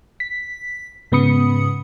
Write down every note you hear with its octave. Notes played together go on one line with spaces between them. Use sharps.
B6
G#2 C#3 B3 B5 D#6 C#7